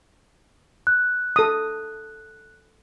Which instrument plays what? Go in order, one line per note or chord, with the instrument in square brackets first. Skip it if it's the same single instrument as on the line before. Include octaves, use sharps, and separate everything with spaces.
[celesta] F#6
[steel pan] A4 D#6